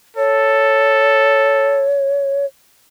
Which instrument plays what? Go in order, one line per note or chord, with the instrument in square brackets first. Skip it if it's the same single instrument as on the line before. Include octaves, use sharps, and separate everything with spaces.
[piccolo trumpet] A4 [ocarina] C#5